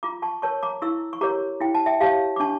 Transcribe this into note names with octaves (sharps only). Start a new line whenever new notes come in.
F4 A#5 D6
A5 C#6
A#4 C#5 A5 C#6
A#5 D6
E4 C#6 E6
C#6
G4 A#4 C#5 A#5 D6
E4 G5
A5
E5 G5
G4 C#5 F5 A5
D6
D4 A5 C#6